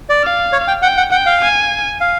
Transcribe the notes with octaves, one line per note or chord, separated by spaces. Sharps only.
D5
F5
C#5
G5
F#5 G5
F#5
F#5 G5
F5
G#5
F5